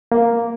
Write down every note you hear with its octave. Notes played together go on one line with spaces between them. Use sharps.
A#3